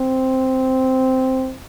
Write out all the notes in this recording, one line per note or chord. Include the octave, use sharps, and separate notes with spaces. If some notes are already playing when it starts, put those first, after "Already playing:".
Already playing: C4